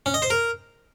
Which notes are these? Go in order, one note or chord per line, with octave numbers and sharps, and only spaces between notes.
C#4
D#5
C5
A#4